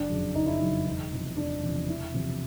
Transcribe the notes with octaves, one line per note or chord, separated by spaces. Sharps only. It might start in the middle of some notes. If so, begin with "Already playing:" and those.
Already playing: F#1 D4
F2 C#3 F#3
F#1 D#4
E4
F2 C#3 F#3 D#4
E1 D#4
E2 C3 F3
E1 D4
E2 C3 F3
E1 E4
E2 C3 F3